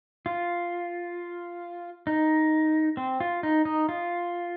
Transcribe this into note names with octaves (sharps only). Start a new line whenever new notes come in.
F4
D#4
C4
F4
D#4
D#4
F4